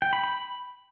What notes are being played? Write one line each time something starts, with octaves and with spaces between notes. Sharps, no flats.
G5
B5
B5